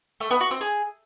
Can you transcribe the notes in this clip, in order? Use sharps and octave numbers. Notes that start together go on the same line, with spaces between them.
A3
B3
F#4
C4
G#4